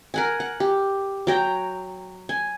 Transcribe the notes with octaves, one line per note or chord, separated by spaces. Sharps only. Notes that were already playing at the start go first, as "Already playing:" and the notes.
A#4 F#5 G#5
F#5
G4
F#3 G5 A#5
G#5